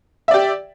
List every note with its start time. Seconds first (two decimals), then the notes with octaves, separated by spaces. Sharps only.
0.28 E5
0.31 D5
0.34 G4